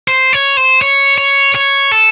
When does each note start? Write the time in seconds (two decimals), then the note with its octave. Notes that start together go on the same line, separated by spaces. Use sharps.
0.08 C5
0.33 C#5
0.57 C5
0.82 C#5
1.18 C#5
1.55 C#5
1.92 A4